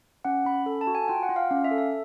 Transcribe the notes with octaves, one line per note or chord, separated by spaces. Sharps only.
C#4 F#5
C#4 B5
A4
A5
F#4
G#5
F4 G5
F#5
F4
F5
C#4 F5
E5
A4
E5